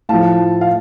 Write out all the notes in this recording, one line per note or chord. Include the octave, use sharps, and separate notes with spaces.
A2 F3 F5 A5
F5